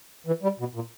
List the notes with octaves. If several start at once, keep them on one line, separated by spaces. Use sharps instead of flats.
E3
G3
B2
A#2